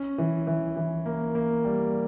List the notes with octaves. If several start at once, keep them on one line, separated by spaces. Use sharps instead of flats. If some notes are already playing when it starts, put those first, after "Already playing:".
Already playing: C#4
E3
E3
E3
A#3
A#3
G3